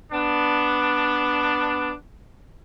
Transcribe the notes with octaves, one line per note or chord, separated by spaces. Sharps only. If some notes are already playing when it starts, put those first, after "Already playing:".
B3 D4